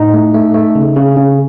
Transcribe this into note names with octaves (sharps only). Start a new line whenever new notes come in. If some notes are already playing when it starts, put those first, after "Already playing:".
Already playing: A2 D#4
A3
A3
A3
C#3
C#3
C#3